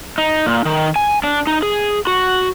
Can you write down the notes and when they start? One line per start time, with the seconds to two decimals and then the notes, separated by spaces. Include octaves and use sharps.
0.18 D#4
0.46 A#2
0.65 D#3
0.96 G#5
1.24 D4
1.47 D#4
1.63 G#4
2.07 F#4